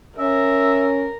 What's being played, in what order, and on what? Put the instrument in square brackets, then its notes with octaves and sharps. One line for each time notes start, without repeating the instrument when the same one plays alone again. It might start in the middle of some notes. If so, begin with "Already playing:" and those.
[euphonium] C#4 [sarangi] A#4 [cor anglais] E5